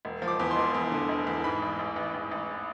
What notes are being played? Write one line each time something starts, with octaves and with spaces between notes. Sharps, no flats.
E1
F3
D6
E2
C6
E1
E2
D3
E1
E2
G#2 B5
A1
A1
A1
A1
A1